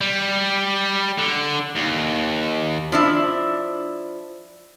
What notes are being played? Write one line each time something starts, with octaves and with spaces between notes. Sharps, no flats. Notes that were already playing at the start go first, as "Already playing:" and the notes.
G3
D3
D#2
F3 D4 E4